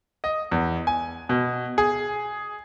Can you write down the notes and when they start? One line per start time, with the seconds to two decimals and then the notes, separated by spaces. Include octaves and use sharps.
0.24 D#5
0.51 E2
0.87 G#5
1.29 B2
1.78 G#4